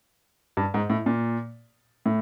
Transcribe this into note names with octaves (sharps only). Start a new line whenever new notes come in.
G2
G#2
A2
A#2
A2